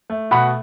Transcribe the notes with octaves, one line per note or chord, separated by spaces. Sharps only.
A3
B2 F#5 B5